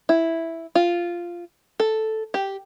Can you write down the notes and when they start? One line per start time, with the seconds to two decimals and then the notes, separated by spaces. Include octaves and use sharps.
0.09 E4
0.75 F4
1.80 A4
2.34 G4